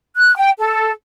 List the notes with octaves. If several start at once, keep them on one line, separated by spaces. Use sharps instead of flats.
F#6
G5
A4